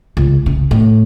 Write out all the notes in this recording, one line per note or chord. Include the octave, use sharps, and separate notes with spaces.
C#2
C#3
A2